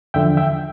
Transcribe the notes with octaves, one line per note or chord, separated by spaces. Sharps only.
E2 D3 F3 E5 G5
E5 G5